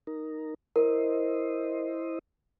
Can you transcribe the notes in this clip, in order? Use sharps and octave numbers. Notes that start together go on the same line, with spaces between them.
D#4 A#4
E4 A#4 C5 D#5